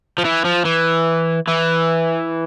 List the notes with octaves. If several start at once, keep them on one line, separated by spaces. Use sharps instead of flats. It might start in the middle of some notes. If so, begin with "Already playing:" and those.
F3
E3
F3
E3
E3